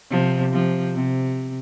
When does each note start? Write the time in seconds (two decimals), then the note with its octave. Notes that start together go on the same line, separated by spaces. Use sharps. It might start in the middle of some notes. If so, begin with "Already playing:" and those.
0.11 C3 F3
0.53 C3 F3
0.95 C3